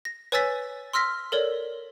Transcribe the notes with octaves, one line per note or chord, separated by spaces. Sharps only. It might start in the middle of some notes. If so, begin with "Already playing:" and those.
A#6
B4 C#5 G#5 E6 A6 B6
C6 E6 F6 A#6 B6
A4 A#4 C#5 D5